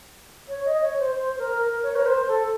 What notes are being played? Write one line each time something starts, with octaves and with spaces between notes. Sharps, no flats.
C#5
D#5
C#5
C5
C5
A#4
A#4
C#5
A#4
C5
A4